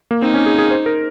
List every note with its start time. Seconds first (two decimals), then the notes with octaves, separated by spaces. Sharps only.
0.11 A#3
0.22 C4 D#4
0.34 C#4
0.46 G#4
0.59 G#4
0.71 C5
0.86 A#4